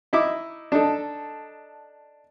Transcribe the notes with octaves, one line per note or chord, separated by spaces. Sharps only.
D#4 E4 E5 D6
D4 D#4 A4